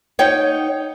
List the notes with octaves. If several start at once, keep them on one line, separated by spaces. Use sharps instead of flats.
D#4 C#5 F#5 G5